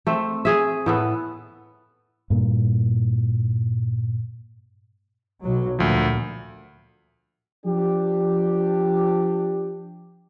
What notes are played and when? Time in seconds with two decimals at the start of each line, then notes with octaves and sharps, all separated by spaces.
0.07 A3 C4
0.45 G#4 E5
0.86 A2 B3 A4
2.30 G2 A#2
5.43 B1 F#3
5.79 D2 A#2 F3
7.66 F3 D4 G4